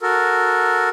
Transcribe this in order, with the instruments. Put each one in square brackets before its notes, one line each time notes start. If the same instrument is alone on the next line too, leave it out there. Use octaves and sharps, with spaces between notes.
[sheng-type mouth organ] F#4 A4 A#4